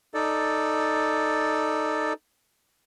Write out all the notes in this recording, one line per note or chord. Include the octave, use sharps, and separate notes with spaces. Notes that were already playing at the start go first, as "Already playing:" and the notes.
D#4 A4 D5